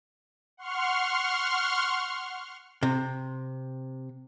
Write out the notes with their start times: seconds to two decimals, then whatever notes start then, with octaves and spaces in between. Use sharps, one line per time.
0.57 F#5 C6 C#6 F6
2.83 C3